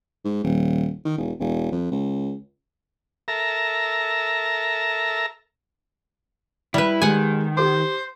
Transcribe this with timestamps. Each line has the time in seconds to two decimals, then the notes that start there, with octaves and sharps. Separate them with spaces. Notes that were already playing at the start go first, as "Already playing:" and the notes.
0.24 G#2
0.44 D#1
1.05 D#3
1.17 E1
1.40 E1
1.72 F2
1.92 C#2
3.28 A4 A#4 E5 A#5
6.74 G3 E4 B4
7.02 D#3 G#3 G4 F#5 G#5
7.57 G4 C5 D6